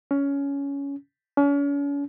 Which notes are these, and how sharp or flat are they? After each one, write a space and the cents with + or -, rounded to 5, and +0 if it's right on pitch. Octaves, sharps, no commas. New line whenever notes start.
C#4 +15
C#4 +40